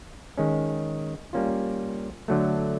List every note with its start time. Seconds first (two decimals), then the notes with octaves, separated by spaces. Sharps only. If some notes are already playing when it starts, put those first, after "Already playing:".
0.38 D#3 G#3 C#4
1.33 G3 A#3 C#4 F4
2.28 D3 F#3 A3